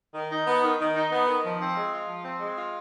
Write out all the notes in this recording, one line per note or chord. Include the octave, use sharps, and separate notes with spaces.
D#3
D#4
B3
D#3
D#3
D#4
B3
D#3
F3
C4
G#3
F4
F3
C4
G#3
F4